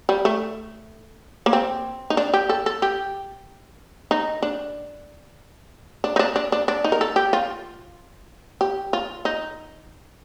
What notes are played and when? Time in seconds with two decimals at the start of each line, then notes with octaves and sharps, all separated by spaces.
0.09 G3
0.25 A3
1.46 A#3
1.53 C4
2.10 D#4
2.17 D4
2.34 G4
2.49 A4
2.66 A4
2.82 G4
4.11 D#4
4.42 D4
6.04 D4
6.16 D#4
6.19 D4
6.36 D4
6.52 D4
6.68 D4
6.84 D#4
6.92 A#4
7.01 A4
7.16 G4
7.33 F4
8.61 G4
8.93 F4
9.25 D#4